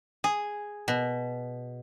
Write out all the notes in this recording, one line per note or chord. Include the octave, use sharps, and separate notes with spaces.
G#4
B2